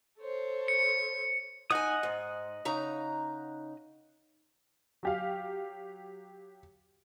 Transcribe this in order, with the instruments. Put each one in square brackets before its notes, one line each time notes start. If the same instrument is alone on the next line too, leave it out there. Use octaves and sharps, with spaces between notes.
[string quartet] A4 C5 C#5
[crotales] C#7
[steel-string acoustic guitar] D#4 G#5 [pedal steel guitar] D#5 F#5 D#6
[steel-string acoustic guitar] G#2
C#3 D#4 A#5
[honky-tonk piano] F#3 G4 F5